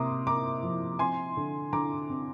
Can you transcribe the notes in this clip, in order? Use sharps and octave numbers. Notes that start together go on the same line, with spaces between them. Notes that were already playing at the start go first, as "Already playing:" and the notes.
Already playing: C3 A#3 A#5 C6 D6 D#6
A#3 A#5 D6
F3
C4 G#5 C6
D3
D3 A#5 D6
C4